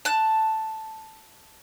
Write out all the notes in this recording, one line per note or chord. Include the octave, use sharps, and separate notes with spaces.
A5 F#6